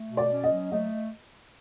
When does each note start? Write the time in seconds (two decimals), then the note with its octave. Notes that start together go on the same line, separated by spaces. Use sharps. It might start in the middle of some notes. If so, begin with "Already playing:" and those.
Already playing: A3
0.09 B2
0.17 D5
0.30 C#4
0.44 D#5
0.51 F#3
0.72 A3 D#5